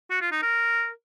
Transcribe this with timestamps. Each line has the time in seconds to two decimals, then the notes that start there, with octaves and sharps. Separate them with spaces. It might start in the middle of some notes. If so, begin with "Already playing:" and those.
0.10 F#4
0.21 F4
0.32 D#4
0.42 A#4